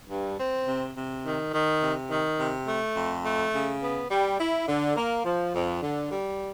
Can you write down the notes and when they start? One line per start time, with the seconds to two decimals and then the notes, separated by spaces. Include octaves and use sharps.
0.10 G2
0.39 C4
0.67 C3
0.96 C3
1.25 D#3
1.53 D#3
1.82 C3
2.11 D#3
2.39 C3
2.67 A3
2.96 F2
3.25 A3
3.54 C#3
3.82 B3
4.11 G3
4.39 E4
4.68 D3
4.96 A#3
5.25 F3
5.54 F2
5.82 D3
6.11 G3